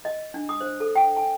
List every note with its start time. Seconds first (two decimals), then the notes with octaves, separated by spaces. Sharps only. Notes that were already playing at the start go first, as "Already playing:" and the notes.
0.05 D#5
0.34 D4
0.49 D#6
0.61 C5
0.80 A4
0.96 G5
1.17 G#5